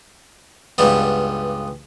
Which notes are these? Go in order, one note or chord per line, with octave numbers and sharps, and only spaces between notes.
C#2 G2 G3 B3